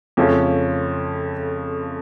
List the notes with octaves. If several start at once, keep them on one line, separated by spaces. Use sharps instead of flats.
F2 C#3 F3 A3 C#4